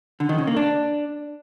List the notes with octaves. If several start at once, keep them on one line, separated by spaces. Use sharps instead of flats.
D3
D#3
C#3
A#3
D4